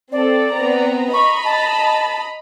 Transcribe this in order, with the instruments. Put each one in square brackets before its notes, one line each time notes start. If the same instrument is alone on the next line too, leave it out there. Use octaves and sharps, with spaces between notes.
[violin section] C4 A4 [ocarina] D5
[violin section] B3 C4 A#5
[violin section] D#5 A#5 B5 [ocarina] C#6
[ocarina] A5